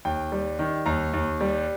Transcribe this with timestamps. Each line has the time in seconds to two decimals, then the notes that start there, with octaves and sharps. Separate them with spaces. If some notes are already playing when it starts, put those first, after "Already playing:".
0.05 D#2 G5
0.32 G3
0.59 D#3
0.86 D#2 A#5
1.14 D#2
1.41 G3